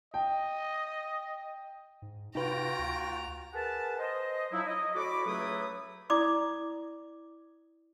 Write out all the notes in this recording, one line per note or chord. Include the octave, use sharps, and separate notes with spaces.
D#5 G5
G#2
C3 D#4 F4 F#4 B4 G5 A#5
D2
G#4 A#4 B4 F#5 A5
C5 D#5
F3 F#3 D#4 E4
D#5
A2 F#4 A4 D5 B5 D6
C#2 F#3 A3 E4 B4 D#6
E4 D5 D6 D#6